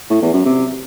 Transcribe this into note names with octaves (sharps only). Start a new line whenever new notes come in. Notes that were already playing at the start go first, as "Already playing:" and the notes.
A2
E2
F#2
C3